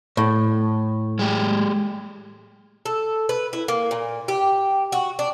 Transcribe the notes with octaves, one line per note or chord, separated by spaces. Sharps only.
A2
G#3 G4
A4
B4
E4
A#3
A#2
G4
F#4
D4